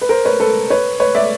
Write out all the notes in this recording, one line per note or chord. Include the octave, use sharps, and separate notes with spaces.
B4
A#4 C5
B4 C#5
A4 B4
B4 C#5
B4 C#5
D5 E5